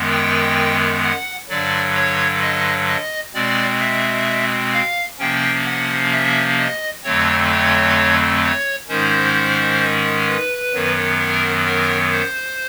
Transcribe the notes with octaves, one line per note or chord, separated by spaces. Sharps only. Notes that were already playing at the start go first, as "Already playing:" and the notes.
Already playing: F#2 D#3 G#3 B3
G5
F#5
G2 D3 F#3 D5
C#5
D#5
D#5
B2 G#3 C4 D5
E5
F5
C3 F3 A#3 C#4 G5
F#5
E5
D#5
F2 D3 F#3 A3 C4 C#5
C#5
C#5
G#2 D#3 G#3 C#4 C5
B4
F#2 D#3 F#3 B3
A#4
A#4
C5